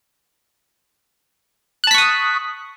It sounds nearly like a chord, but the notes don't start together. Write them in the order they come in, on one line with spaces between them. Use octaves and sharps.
F#6 A5 B6 C#6 D#6